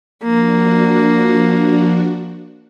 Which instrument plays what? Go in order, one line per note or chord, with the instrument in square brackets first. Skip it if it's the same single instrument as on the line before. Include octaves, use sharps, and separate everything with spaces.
[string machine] F3 D4 F#4 [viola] A#3